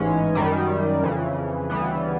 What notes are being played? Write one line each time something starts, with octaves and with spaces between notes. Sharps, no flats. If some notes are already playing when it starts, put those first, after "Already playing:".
Already playing: A1 G#2 E3 G#3 C#4
F#2 D#3 G3
F2 C#3 E3
D2 C#3 E3 G3 B3